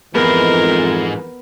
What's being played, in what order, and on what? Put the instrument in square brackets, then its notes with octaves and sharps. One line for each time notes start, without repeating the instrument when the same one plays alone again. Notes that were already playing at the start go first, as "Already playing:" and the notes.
[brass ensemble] F2 E3 [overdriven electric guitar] G#2 G#3 [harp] B3 [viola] A#4